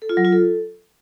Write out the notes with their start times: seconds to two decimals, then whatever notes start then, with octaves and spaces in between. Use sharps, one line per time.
0.02 A4
0.09 F4
0.17 F#3
0.25 F4
0.32 A4